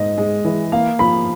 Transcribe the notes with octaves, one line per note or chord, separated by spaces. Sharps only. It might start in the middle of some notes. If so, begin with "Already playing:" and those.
Already playing: G#2 D#5
G#3
E3
A#3 F5
F3 B5